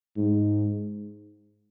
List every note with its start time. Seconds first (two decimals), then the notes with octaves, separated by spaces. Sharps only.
0.17 G#2